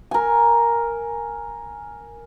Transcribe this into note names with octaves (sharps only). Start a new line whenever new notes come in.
A#4 G#5